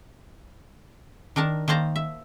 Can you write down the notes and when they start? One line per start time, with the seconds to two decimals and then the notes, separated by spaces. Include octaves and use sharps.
1.36 D#3 D4 A#4 A5
1.68 D#3 A#3 C5 A5 A#5
1.96 E5